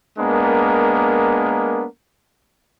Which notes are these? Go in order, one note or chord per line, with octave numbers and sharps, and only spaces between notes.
G#3 A#3 B3 D4 A#4